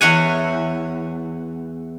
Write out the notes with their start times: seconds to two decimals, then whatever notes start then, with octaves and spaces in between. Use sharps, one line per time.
0.01 E2 C#5 F#5 G#5